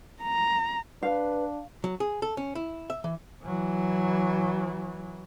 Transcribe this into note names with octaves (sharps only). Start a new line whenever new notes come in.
A#5
D4 B4 F5
F#3
G#4
A4
C#4
E4
E5
E3
E3 F#3